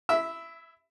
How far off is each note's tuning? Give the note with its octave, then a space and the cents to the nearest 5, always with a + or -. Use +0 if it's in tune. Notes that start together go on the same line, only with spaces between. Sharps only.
E4 +15 E5 -10